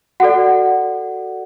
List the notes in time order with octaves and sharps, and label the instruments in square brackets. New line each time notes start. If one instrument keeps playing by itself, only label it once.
[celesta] F#4 A4 D5 F#5